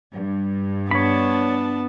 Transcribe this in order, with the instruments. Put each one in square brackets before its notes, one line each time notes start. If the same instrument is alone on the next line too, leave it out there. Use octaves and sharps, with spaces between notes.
[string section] G2
[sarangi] B3 [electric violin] D4 A5 [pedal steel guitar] C#5 B5